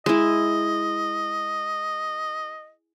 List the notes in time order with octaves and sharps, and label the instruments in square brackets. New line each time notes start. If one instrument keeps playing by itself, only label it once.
[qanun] G#3 E4 [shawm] D#5